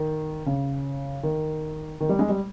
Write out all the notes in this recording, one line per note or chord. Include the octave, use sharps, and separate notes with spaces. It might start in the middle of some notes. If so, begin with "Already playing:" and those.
Already playing: D#3
C#3
D#3
D#3
G3
G#3
G3